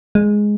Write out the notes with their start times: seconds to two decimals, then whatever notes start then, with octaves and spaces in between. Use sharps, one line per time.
0.15 G#3